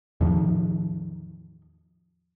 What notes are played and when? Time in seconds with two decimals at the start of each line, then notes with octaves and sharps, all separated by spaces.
0.21 E2 A2 D#3 F3